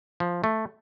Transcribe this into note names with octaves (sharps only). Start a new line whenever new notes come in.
F3
A3